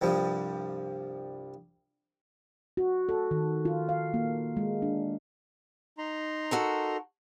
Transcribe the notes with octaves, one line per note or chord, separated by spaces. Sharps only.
C2 G2 F3 G3
F#4
A4
D#3
F4
F5
A#3
G#3
D4
D#4 A#5 C6
F#4 A4 A#4